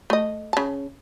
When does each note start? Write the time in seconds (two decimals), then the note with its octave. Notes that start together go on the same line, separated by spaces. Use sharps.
0.10 A3 D#5
0.53 C#3 A5